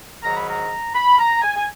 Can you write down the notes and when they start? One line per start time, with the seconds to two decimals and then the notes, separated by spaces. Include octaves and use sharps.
0.23 G#2 D#3 F#3 A#5
0.36 B5
0.49 A#5
0.95 B5
1.18 A#5
1.42 G#5
1.56 G#5